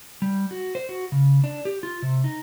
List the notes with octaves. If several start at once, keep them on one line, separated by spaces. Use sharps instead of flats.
G3
F#4
C5
F#4
C#3
D4
G4
F4
C3
D#4